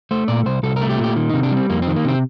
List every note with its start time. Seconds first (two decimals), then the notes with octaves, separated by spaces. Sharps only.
0.11 A3 C5
0.28 A#2 D5
0.46 C2 C5
0.63 C2 A4
0.76 A#4
0.81 A3
0.90 G4
0.98 A#2
1.04 G4
1.16 D#3
1.30 C3 D#4
1.43 D4
1.52 G3
1.57 C4
1.69 F2 A#3
1.82 C4
1.87 D#3
1.96 A#3
2.05 C3 C4